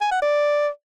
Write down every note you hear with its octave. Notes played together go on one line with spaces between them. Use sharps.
G#5
F#5
D5